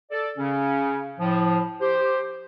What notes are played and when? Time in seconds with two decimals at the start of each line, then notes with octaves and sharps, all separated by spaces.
0.11 A4 D5
0.37 C#3 C#4
1.19 A2 F3
1.80 G4 C5